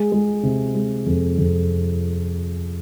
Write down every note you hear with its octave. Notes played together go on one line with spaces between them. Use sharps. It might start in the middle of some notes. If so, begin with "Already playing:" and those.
Already playing: G#3
G#3
C3
G#3
F2
F2